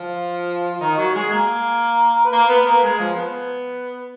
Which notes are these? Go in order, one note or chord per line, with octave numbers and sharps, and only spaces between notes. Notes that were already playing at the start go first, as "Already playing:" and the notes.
Already playing: F3 F4
F4
D#3 D#4
F#3 F#4
G#3 G#4
A#3 A#4
B4
A#3 A#4
B3 B4
A#3 A#4
G#3 G#4
F3 F4
B3